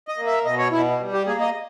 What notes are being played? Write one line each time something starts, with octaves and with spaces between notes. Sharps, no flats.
D#5
A#3
E5
B2 D#5
C#5
B2 E4
G3
G4
A#3 G#4
D#5